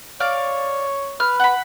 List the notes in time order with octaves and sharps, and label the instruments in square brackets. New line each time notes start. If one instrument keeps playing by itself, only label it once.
[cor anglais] C#5 [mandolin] D5 F5 D6
[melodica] B4 [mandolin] F6
[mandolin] F#5 B5